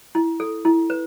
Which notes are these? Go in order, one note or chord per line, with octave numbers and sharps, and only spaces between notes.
E4
A4
E4
B4